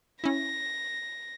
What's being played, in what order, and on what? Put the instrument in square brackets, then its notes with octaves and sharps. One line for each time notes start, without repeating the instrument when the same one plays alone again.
[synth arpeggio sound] C#4 E4 [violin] A#6